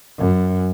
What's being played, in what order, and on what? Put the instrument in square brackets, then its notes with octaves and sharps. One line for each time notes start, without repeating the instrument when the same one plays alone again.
[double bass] F#2